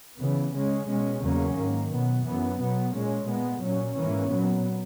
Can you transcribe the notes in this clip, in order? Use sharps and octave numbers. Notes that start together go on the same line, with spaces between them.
C#3 E3 B3
C#3 G#3 C#4
B2 G#3 C#4
E2 C#3 F#3 A#3 C#4
G#2 D#3 A#3
B2 F#3 B3
F#2 E3 B3
B2 F#3 B3
A#2 G#3 C#4
A#2 G#3 B3
A#2 F#3 C#4
G#2 E3 A#3 C#4
A#2 F#3 B3